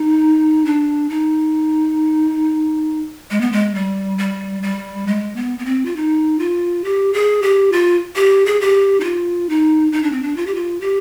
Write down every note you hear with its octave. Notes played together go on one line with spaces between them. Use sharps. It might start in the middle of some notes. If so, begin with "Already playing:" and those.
Already playing: D#4
D4
D#4
G#3
B3
G#3
G3
G3
G3
G#3
B3
B3
C4
F4
D#4
F4
G4
G#4
G4
F4
G4
G#4
G4
D#4
F4
D#4
D#4
D4
C4
D4
F4
G4
F4
G4